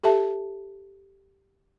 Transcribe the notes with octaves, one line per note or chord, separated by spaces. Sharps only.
G4 A4 E5 A5